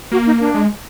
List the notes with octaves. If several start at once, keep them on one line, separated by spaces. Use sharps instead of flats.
A#3 F#4
D#4
D4
G#3